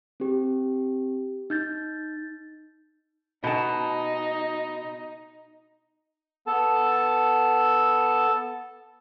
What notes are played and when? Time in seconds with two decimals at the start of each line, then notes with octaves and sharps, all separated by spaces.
0.20 C4 G4
1.50 D#4 G6 A6
3.44 B2 D#4 A5
6.47 B3 A4 A5